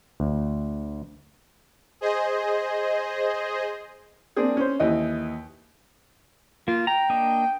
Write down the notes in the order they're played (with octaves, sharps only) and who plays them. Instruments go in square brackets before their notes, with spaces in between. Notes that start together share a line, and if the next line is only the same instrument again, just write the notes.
[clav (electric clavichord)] D2
[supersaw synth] G#4 C5 D#5
[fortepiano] A#3 C4 D4 G#4
C#4 C5
D#2 E3 D#5
[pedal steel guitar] A#3 [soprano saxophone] F4
[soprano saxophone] G5 [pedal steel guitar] A#5
[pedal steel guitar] A#3 D4 D#5